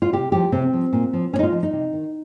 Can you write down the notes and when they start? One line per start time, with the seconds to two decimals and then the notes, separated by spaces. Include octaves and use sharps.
0.02 F4
0.13 C3 G4
0.32 F3 G4
0.52 C3 C4
0.73 F3
0.93 A#2
1.13 F3
1.33 A#2 C#4
1.39 D#4
1.43 F4
1.52 F3
1.63 D#4
1.73 C3
1.93 D#3